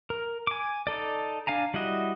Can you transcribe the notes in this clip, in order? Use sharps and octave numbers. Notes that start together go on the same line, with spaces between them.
A#4
G#5 D6
D#4 A4 D5
D4 F5 G#5 A#5
G3 E4 F#4 D#5